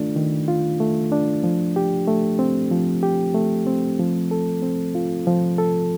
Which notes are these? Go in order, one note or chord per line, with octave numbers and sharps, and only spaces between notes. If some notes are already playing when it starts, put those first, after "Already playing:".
Already playing: D#3 A3 D4 F4
D#3
F4
A3
D4
F3
G4
A3
C4
F3
G4
A3
C4
F3
A4
C4
F4
F3
A4